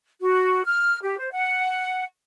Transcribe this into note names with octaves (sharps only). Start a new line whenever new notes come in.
F#4
F6
G4
C5
F#5